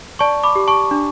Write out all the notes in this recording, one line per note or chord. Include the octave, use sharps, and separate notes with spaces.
D5 A5 C#6
B5 D6
G4
A5 C#6
D4